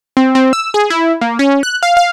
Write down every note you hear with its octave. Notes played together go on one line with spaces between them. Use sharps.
C4
C4
E6
G#4
E4
A#3
C#4
F#6
F5
F5